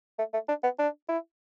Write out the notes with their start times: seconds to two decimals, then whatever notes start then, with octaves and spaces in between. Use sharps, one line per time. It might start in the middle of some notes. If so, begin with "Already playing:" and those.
0.19 A3
0.33 A3
0.49 D4
0.64 B3
0.79 D4
1.09 E4